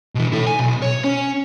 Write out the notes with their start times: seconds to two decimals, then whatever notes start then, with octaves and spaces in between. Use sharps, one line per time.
0.15 B2 E3
0.32 E4 A4
0.47 G#5
0.59 B1
0.82 C#5
1.04 C#4